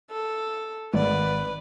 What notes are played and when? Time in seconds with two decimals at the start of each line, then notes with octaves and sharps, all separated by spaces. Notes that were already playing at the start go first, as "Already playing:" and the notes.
0.11 A4
0.94 G#1 B4 D5